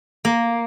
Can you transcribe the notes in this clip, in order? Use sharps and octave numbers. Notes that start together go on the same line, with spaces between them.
A#3